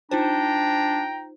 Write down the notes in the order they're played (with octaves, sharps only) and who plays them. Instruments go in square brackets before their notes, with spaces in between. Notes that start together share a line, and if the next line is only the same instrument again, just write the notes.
[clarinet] D4 [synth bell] D#4 F4 C5 [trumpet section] G5 A#5